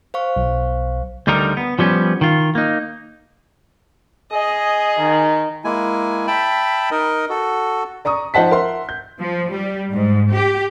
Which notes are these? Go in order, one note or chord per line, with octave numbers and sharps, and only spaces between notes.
C5 F5 C#6
B1
D2 D3 G3 D#4 A#4
B3
F3 G3 B3 C#4
D#3 F4
A#3 D#4
G#4 D#5
D#3
G#3 A#3 E4 G#5
E5 G5 A5 B5
D#4 A#4 D#5
F#4 A4
D5 A#5 C#6 D#6
F3 D#4 C5 F#5 A5 B6
A#4 E5 F#5 C6
G6
F3
G3
G#2
G4